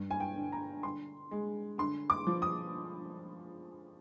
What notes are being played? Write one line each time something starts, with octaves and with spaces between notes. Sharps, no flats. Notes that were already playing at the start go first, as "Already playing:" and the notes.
Already playing: G2
G#5
G5
D3
A#5
D3 C6
G#3
D3 C6
D6
F3
D#6